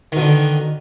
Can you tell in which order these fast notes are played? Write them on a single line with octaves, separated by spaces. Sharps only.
D#3 B2 D3